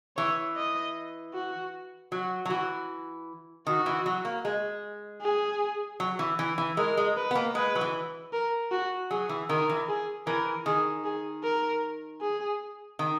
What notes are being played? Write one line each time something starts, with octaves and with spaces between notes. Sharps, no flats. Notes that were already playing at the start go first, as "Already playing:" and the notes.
E3 C#5
D#5
F#4
F#3 F#4
F#3
E3 F#4
D#3 F#4
E3
F#3
A#3
G#3
G#4
F#3
E3
E3
E3
G#3 A#4
G#3
B4
B3
A#3
G#3 B4
F#3
E3
A#4
F#4
F#3 G#4
E3
D#3 A#4
E3
G#4
E3 A#4
D#3 G#4
G#4
A#4
G#4
D#3